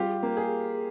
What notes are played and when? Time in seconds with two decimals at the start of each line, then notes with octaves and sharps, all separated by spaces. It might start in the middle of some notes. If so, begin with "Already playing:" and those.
Already playing: G3 F4 G4
0.23 A#3
0.37 G#4